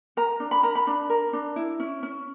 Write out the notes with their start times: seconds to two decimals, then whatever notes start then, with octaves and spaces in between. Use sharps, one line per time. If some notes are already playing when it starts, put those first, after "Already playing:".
0.17 A#4 A#5
0.40 D4
0.51 B5
0.63 A#4 A#5
0.75 B5
0.87 D4
1.09 A#4
1.33 D4
1.56 E4
1.80 C#4
2.03 C#4